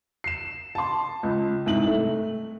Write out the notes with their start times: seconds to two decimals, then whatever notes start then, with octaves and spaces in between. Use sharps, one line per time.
0.24 C7 E7
0.75 A5 C6
1.23 C#2
1.66 C2 G#2 F#7
1.86 A3